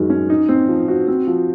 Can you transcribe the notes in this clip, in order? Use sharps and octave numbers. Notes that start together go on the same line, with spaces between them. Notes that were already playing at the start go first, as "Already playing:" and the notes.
Already playing: F#2 D#3 G#3
C#4
D#4
C4
F3
F#4
C4
F3